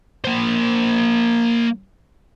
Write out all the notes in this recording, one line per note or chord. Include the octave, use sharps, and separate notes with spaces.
A#3 C5